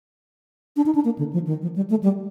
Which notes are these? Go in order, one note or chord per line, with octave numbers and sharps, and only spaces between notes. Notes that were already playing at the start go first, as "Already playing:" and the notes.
D4
D#4
D4
A#3
D3
F3
D#3
F3
G3
A3
G3